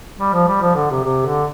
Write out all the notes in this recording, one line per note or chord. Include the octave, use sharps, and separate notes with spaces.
G3
F3
G3
F3
D3
C3
C3
D3